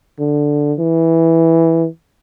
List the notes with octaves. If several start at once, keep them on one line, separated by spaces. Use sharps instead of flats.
D3
E3